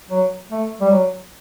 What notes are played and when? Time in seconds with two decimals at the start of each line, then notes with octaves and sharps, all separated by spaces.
0.11 F#3
0.51 A3
0.81 G3
0.91 F#3